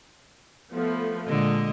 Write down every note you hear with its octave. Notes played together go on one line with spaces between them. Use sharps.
F3 A3 B3
A#2 D3 G#3 D#5